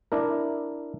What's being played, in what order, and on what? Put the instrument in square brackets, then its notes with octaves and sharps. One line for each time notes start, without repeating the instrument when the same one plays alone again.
[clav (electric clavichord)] D4 E4 A#4